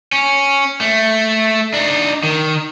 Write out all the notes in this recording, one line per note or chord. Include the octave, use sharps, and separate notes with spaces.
C#4
A3
D4 D#4
D#3